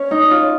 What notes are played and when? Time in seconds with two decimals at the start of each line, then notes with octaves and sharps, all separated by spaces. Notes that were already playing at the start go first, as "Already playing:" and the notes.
Already playing: C#4 C#5
0.11 D#4
0.31 F4